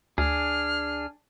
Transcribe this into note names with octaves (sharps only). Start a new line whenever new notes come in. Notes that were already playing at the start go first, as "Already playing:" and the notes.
D2 D4 G#4 F6